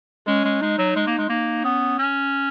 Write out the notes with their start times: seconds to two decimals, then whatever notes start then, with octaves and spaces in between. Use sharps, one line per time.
0.27 G#3 C#4
0.45 G#3
0.61 G#3 D#4
0.78 F#3
0.96 G#3
1.07 A#3
1.18 G#3
1.29 A#3 D#4
1.64 B3 C#4
1.99 C#4